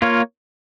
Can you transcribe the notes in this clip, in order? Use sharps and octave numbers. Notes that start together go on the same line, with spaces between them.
A#3 F4 C#5